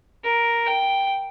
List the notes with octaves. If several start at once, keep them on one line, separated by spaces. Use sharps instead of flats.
A#4
G5